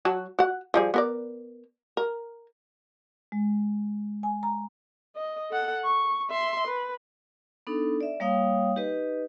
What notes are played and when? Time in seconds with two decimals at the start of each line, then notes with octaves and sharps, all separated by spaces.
0.05 F#3 F#4 A5
0.39 F#4 F#5
0.74 F3 G3 G#4
0.94 B3 A#4 D5
1.97 A#4
3.32 G#3
4.23 G#5
4.43 A#5
5.16 D#5
5.51 A4 F#5
5.85 C#6
6.30 E5 C6
6.67 B4
7.67 B3 D4 D#4 A4
8.01 D5 E5
8.20 G3 A#3 C#5 F5 G5 D#6
8.76 D#4 G4 B4 D#5